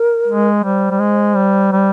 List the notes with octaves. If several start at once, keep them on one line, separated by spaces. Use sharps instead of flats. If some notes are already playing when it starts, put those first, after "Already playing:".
Already playing: A#4
G#3
G3 C5
G3
G#3
G3
G3